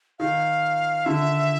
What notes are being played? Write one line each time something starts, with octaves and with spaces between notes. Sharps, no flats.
D#3 F5
D3 E5